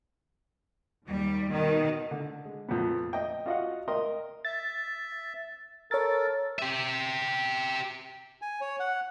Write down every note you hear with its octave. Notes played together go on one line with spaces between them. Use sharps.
D#2 G3
B2 D#3
D3
G#3
F2 A#2 B3
D#5 G5
F4 F#4 D#5 F5 F#5
A#4 D#5 G5 C6
E5 A6
A4 A#4 C#5 A6
G4 E5
G#5
C#5
F#5